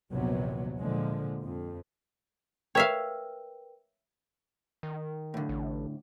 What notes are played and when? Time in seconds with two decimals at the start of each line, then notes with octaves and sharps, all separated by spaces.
0.10 A#1 D#2 C3 F#3 B3
0.79 A#2 D3 F3 G#3
1.43 F2
2.75 A#4 B4 C#5 E5 F5 G5
4.83 D#3
5.34 A2 D3
5.49 A1